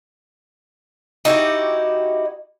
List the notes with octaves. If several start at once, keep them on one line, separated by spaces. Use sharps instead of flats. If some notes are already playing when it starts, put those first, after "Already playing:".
D#4 E4 F#4 G4